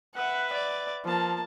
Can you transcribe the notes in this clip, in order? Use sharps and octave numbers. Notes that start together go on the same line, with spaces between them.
B4 E5 F#5
D5
F3 A#3 A5